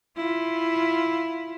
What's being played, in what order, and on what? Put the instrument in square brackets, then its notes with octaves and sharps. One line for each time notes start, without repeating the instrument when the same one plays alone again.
[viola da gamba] E4 F4